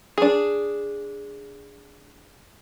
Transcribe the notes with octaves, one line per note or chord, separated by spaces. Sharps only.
D4 G#4